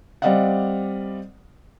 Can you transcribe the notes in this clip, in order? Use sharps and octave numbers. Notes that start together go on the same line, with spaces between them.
G3 C4 D5 D#5 F5 F#5